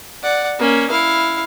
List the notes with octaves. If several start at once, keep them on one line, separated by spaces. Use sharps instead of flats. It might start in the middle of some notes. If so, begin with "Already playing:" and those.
D5 F#5
A#3 C#4
E4 F5